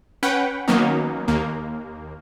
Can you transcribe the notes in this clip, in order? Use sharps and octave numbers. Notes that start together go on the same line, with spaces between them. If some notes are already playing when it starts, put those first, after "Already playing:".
C#4 B4 F#5 G5
D#3 F#3 A#3 B3 C#4 D#4
D#2 A#3